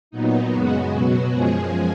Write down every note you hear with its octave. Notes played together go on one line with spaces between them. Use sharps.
A#2 F#3 B3 D#4
F#2 C#3 G#3 B3 F#4
B2 F#3 B3
F#2 F3 G#3 G#4